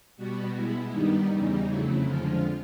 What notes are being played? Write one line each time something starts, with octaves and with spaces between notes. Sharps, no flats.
B2 G3 B3 F#4
B2 G#3 B3 E4
G2 D#3 G3 B3 D#4
E2 C#3 E3 G3 D#4
F2 C#3 F#3 A3 E4
F2 D3 F3 G#3 F4